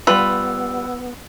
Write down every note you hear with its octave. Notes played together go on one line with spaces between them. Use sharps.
G3 B3 F4 B4 E6